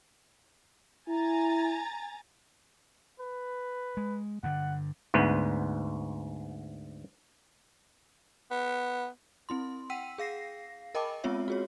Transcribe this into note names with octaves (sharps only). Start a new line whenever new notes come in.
E4 G#5 A#5 A6
B4
G#3
G2 D3 F#5
D2 G#2 B3
B3
C4 E4 C6
F#5 G5 E6 B6 D#7
G#4 F5 A#6 C7
A#4 D#5 G5 A5 B5 D6
G#3 B3 C4 F4 C#5 E5
F#4 G#4 C#5